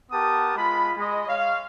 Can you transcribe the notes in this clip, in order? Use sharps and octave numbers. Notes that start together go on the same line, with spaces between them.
B3 G4 A#4 A5 D#6
G#3 F4 B5
G#3 D#5
C#5 F5